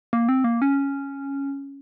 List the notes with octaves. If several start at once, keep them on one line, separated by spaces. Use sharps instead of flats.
A#3
C4
A#3
C#4